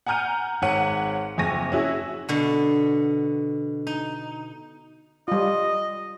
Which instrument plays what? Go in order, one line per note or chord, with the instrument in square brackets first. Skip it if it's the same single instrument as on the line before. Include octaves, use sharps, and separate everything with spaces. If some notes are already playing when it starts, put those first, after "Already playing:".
[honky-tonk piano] F#5 G#5 A#5 F6 G6 D#7
G#1 C#5 F#5 D#7
F#1 F2 G#5 C#6 A#6 D#7
C#4 E4 F#4 G#4
[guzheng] B2 D3
D#4
[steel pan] G3 F4 [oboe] D#5